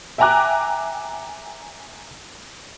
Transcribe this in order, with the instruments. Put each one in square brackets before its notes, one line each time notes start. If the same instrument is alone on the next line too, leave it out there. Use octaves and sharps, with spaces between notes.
[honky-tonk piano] E5 G5 G#5 A#5 D6 F#6